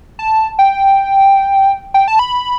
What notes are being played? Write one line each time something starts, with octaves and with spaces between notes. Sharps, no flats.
A5
G5
G5
A5
B5